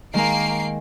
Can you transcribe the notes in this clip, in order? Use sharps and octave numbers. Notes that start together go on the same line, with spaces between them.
D#3 G#3 A#3 C7 D7